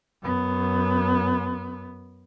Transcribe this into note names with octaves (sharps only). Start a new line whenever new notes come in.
F#2 B3